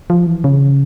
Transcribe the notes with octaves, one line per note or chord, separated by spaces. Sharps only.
F3
E3
C#3